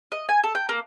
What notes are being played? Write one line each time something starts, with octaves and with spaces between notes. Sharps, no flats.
D#5
G#5
A4
G5
A#3